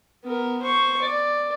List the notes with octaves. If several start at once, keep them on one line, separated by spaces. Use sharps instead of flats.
B3 A#4
C5 C#6
D5